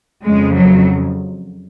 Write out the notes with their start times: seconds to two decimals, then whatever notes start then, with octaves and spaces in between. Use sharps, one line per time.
0.24 F2 C#3 F3 G#3
0.55 F#3